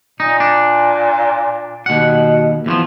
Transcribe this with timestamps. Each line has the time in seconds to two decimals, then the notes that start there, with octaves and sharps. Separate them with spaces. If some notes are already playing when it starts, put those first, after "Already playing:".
0.20 A#2 D#4
0.40 D4
1.86 D#2 B2 F#5
2.66 E2 E3 F3